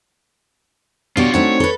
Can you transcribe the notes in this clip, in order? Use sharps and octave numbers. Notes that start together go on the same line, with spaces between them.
B2 D4 F4 G4 C#5 D5
A3 C4 D4 D#4 F#4 C5 C#5
A4 B4